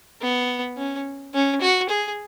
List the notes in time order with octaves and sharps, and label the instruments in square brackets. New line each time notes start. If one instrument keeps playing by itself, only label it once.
[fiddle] B3
C#4
C#4
F#4
G#4